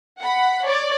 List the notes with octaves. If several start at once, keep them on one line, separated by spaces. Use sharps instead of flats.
F#5 B5
C#5 D5